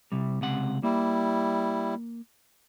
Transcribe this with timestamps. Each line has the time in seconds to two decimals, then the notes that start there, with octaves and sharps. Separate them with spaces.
0.12 C3 G3
0.41 C#2 C3 F#5
0.83 G3 A#3 E4